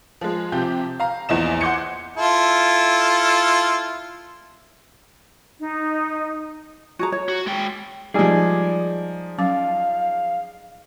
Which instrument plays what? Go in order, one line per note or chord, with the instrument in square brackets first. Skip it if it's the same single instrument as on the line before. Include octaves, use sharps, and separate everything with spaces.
[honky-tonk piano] F3 G#3
C3 F3 G4 G6
F5 A#5
A#1 E2 E4 D#5 E7
F#5 C6 D6 G6 G#6 C#7
[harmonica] E4 F4 A4
[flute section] D#4
[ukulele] F#4 G#4 A#5
C#5
[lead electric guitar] F#4
G#3 G5
[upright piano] F3 D#4 [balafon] G3 G#3 G4 [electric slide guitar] G#4 D5 G#5
[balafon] F#3 C#4 D6 [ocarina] F5